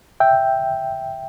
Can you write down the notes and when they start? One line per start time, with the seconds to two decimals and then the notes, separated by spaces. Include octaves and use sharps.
0.20 E5 G5